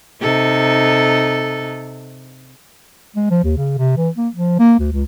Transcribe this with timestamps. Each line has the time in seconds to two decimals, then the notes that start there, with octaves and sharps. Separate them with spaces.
0.22 C3 D#4 A4
3.16 G#3
3.31 F3
3.44 D#2
3.57 C#3
3.78 C3
3.97 E3
4.17 A#3
4.34 F3
4.59 A#3
4.79 D2
4.93 C#2